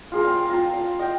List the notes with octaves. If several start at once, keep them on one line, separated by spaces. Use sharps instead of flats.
F4 G#4 A#4
C4 F5
F4 A5 A#5
A#4 F5
D#5 G5